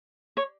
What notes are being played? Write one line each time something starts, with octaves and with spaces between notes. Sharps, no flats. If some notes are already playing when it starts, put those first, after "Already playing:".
C#5